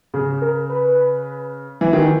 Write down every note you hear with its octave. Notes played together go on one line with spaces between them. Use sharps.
C#3 G#4
A#4
B4
E3
D#3